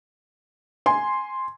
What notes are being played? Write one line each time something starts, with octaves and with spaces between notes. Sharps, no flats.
G#5 C6